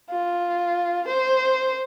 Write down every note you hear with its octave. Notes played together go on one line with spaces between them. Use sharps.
F4
C5